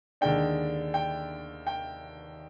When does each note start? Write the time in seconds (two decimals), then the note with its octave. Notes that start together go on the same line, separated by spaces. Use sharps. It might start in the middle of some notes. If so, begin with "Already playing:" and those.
0.21 D#2 D3 G#3 D4 G5
0.94 G5
1.67 G5